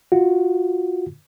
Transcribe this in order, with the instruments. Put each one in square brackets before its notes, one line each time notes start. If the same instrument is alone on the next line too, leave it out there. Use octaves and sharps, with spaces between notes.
[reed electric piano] F4 F#4